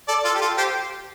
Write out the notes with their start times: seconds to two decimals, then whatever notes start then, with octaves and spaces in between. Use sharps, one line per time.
0.08 A4 D5
0.25 F4 A4
0.35 G4
0.41 F4 A4
0.58 G4 C5